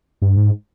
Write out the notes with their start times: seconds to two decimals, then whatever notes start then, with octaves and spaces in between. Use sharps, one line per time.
0.22 G2
0.37 G#2